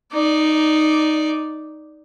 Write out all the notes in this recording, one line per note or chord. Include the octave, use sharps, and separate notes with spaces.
D#4 D5